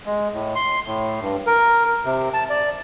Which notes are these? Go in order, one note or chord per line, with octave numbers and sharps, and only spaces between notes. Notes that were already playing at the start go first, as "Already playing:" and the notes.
G#3
A2
C6
A2
G2
A#4
C3
A5
D5